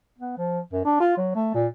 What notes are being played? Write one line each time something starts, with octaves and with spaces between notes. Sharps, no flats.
B3
F3
F#2
D4
F4
F#3
A3
A#2